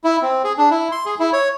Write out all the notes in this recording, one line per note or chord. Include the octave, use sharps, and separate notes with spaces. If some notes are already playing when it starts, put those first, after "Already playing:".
E4
C4
G#4
D4
E4
C6
G#4
E4
C#5